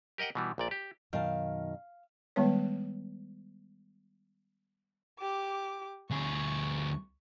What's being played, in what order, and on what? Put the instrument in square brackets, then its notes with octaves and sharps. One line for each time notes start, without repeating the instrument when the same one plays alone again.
[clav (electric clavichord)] G4 A#4 D#5 F#5 G5
B2 E3 G3
A#1 A#2 D5
G4
[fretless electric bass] F#2 B2 F#3 [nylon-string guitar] D#3 A5 [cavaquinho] F5
[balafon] D#3 G3 G#3 B3 B4 C#5
[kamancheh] G4 D6
[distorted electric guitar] D2 G#4 [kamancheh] C#6